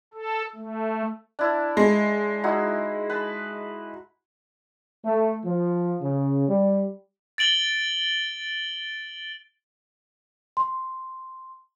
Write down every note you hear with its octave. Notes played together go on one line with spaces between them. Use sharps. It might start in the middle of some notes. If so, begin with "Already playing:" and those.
A4
A3
D4 E4
G#3
D#4 E4 F#4
B4 A5
A3
F3
C#3
G3
A6 D7 F#7 G7
C6